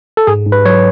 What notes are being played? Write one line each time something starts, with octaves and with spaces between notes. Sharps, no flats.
A4
G#2 G#4
G#2
B4
F#3 C#5